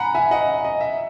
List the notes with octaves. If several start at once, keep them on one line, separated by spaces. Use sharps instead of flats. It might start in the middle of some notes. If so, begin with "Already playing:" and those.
Already playing: F#5 G#5 A#5 B5
E5 G#5
D#5 F#5
D#5
E5